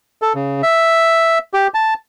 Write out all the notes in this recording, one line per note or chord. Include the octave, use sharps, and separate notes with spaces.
A4
C#3
E5
G4
A5